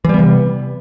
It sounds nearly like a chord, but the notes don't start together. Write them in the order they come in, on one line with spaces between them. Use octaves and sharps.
E3 G3 B3 C3